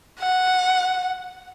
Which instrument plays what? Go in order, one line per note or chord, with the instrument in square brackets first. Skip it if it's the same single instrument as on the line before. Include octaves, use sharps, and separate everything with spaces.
[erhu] F#5